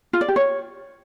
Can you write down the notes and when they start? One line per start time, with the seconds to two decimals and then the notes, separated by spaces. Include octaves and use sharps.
0.13 F4
0.21 D5
0.28 G4
0.36 C#5